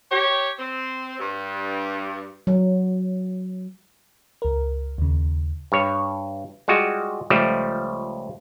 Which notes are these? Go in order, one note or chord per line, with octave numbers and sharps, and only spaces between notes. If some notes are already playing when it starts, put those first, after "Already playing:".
G4 C#5
C4
G2
F#3
C#2 A#4
D#2 C#3
G2 C#5
G3 G#3 F4 F#4
C#2 F3 G3 A3